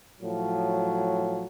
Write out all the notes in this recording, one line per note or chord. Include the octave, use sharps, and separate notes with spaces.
A2 F3 F#3